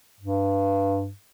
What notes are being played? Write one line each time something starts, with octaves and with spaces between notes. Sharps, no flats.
G2